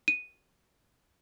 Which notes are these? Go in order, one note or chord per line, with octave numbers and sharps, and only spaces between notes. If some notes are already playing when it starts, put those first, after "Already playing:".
D#7